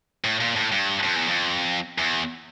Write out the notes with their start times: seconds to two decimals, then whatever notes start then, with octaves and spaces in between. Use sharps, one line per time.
0.24 A2
0.41 A#2
0.56 A2
0.72 G2
1.03 F2
1.16 E2
1.28 F2
1.98 E2